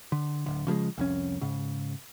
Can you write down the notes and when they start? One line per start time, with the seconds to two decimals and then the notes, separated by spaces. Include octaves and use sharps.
0.12 D3
0.46 D1 D3
0.67 C#3 F3 G3 G#3
0.98 C2 F2 C#4
1.41 G#2 C#3